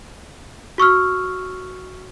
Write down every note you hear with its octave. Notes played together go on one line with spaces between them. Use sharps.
F#4 C#6 E6 F6